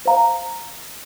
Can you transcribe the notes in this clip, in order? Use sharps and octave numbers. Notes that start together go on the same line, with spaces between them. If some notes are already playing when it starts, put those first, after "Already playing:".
C5 F5 A#5